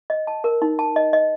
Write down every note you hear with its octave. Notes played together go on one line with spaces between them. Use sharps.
D#5
A5
A#4
D#4
A5
D#5
D#5